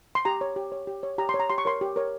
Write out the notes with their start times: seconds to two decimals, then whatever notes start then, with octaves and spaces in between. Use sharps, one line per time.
0.15 C6
0.25 G4 A#5
0.41 C#5
0.56 G4
0.72 C#5
0.87 G4
1.03 C#5
1.18 G4 A#5
1.29 C6
1.34 C#5
1.40 A#5
1.50 G4 C6
1.58 C#6
1.65 A#4 C#5 C6
1.81 G4
1.96 A#4 C#5